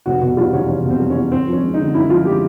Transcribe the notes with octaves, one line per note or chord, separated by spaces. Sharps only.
F1 F#4
B2 F#4
G3 F4
E2 C#4
F1 C#4
B2
C4
G3
C#4
E2
F#2 C4
F3
C#4
G#3
D3 D#4
F#2 E4
F3 F4
G#3 G4